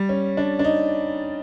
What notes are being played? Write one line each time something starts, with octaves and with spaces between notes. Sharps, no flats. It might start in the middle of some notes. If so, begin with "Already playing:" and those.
Already playing: G3
C#4
D4
D4
D#4